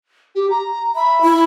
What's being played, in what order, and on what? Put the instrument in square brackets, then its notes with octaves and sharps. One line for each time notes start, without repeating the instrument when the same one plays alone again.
[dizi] G4
A#5
[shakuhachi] E5 [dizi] B5
[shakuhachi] E4